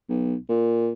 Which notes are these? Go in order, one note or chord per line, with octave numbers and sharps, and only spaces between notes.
B1
A#2